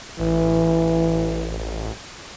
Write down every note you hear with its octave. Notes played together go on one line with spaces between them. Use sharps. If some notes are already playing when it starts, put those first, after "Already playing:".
A1 E3